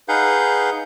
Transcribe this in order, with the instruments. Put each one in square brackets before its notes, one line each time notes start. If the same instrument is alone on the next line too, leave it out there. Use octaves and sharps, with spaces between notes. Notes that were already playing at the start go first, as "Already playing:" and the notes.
[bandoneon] D#4 G#4 B4 F5 F#5 G6